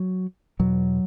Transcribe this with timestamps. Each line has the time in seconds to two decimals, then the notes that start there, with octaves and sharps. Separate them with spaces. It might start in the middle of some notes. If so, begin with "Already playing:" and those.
Already playing: F#3
0.59 E2 B2 F#3